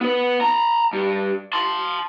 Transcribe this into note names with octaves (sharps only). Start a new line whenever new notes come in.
B3 B4
A5 A#5
G2
A5 C6